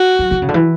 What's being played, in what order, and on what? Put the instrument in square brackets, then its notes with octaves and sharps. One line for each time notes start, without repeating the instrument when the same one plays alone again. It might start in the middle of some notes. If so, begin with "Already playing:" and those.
Already playing: [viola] F#4
[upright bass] F#3
D3
C#3
D3
E3